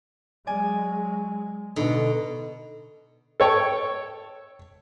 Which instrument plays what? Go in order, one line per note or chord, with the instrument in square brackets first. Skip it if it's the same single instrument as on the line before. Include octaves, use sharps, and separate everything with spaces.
[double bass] F#3 G#3 [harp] D5 G#5
[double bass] B2 [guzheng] D3 [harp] D#4 D#5
[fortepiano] A4 C#5 G5